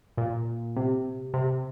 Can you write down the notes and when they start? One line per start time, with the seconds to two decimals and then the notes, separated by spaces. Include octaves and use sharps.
0.18 A#2
0.76 C3
1.34 C3